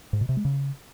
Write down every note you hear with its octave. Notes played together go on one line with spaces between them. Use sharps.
G#2
B2
C3
G#3
C#3